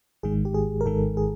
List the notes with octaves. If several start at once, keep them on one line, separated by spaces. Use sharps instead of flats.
G#1 G#2 D#3 G#3 G#4
G4
G#4
A#4
G#1 G#2 D#3 G#3 A4
G#4